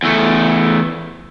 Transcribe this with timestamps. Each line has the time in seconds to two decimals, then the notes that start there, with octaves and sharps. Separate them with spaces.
0.03 E2 A3